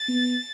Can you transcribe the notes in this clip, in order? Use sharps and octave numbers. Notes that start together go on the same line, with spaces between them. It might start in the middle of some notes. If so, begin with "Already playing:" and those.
Already playing: A6
B3